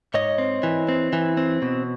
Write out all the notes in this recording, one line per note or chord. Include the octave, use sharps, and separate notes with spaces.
G#2 C#5 D#5
C4
E3
C4
E3
C4
B2